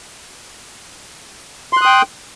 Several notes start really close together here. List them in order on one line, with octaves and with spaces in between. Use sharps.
C6 F#6 D#6 G5